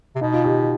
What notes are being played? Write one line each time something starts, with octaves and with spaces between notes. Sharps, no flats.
C3
B2 D#4
F4
G4